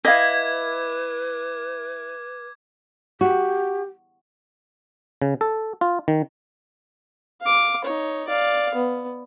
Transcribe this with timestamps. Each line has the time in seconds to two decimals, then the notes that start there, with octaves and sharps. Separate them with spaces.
0.05 E4 B4 D#5 F5 D6 G#6
3.21 F#4 G4
5.22 C#3
5.41 A4
5.81 F4
6.08 D#3
7.41 F5 D6
7.85 D#4 C#5
8.28 D5 F5
8.75 B3